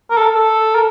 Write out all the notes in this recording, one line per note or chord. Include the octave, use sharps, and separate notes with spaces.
A#4
A4
A4
A#4